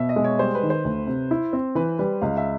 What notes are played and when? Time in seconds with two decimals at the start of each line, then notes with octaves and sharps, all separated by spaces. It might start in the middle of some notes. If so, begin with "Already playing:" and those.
Already playing: B2 E5
0.09 D#5
0.16 G#3
0.24 C#5
0.39 G3 C5
0.55 B4
0.63 D#3
0.70 C5
0.85 D2
1.07 C3
1.31 E4
1.53 C4
1.75 E3 B4
1.99 G3 B4
2.21 C#2 F5
2.37 E5